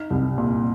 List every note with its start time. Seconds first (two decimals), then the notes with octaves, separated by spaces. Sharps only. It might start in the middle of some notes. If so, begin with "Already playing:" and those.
Already playing: D#4 F6
0.10 C2
0.38 A#2